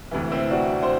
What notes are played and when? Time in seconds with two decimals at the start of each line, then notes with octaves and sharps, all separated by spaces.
0.11 D2 C3 E3
0.32 C4 E4
0.50 D4 F#4
0.82 C5